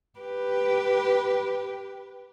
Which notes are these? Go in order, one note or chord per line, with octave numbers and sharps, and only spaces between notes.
G4 B4